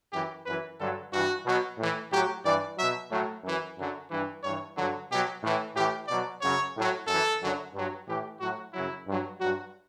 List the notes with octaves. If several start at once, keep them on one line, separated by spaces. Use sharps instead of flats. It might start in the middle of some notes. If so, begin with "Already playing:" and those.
F#2 E3 G4
F#2 E3 B4
G2 D3 F#3 A4
G2 E3 F#4
B2 F#3
A2 E3
A2 F#3 G4
G2 E3 D5
B2 F#3 E5
A2 F#3
F#2 E3
F#2 D3 F#3
G2 E3
G2 E3 C#5
G2 D3 F#3
B2 F#3 G4
A2 E3
A2 E3 G4
B2 F#3 D5
F#2 C#3 F#3 C#5
A2 F#3
F#2 E3 A4
F#2 D3 F#3
G2 F#3
A2 E3 G4
A2 F#3 F#4
F#2 C#3 F#3 E4
G2 F#3
G2 F#3 F#4